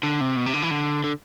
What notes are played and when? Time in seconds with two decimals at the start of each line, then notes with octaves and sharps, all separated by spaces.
0.03 D3
0.21 C3
0.37 B2
0.46 C3
0.54 D3
0.62 E3
0.71 D3
1.04 D3